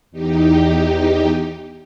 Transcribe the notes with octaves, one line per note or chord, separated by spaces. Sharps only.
E2 D#4 G4